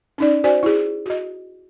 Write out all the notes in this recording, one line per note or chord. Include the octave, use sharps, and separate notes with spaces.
C#4 D#4 D5
F#4 C5 D5 G#5
E4 G#4
F#4 D#5